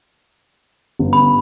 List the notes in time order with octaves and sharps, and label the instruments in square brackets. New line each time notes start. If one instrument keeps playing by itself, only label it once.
[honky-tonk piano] G1
[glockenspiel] B5